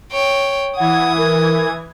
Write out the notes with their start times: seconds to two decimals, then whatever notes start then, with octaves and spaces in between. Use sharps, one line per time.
0.12 C#5 G5
0.77 E3 F#5 D#6 G#6
1.18 A#4